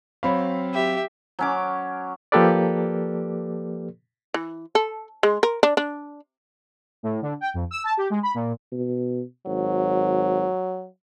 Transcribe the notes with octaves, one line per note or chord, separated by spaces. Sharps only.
F#3 C4 C#5 F5 B5
G4 E5
F#3 C#4 D6
F3 A#3 G4 A4 B4 D5
E3
A4
G#3
A#4
D4
D4
A2
D3
G5
F2
E6
A5
G4
G#3
B5
A#2
B2
G#1 F#3